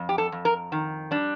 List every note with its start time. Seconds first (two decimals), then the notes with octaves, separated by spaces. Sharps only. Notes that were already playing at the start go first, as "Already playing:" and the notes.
Already playing: F2
0.09 G4
0.18 A4
0.32 F2
0.45 A#4
0.72 D#3
1.11 G3 D4